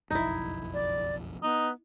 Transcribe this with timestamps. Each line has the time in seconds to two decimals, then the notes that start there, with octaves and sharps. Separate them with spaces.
0.11 F#1 B1 F2 D#4 E4
0.74 D5
1.43 B3 D#4